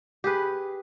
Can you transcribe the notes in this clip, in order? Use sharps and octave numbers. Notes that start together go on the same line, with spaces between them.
G4 G#4 B4